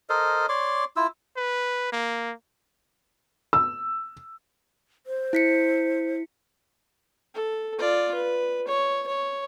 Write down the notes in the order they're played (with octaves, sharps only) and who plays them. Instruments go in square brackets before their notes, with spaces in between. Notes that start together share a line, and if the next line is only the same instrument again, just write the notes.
[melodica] A4 A#4 C5 D#5
C#5 D5 C6 D6
E4 F4 E6
[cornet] B4
A#3
[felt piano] E6
[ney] C5
[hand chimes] E4 B6 C#7
[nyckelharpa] A4
F4 D5
B4
C#5
C#5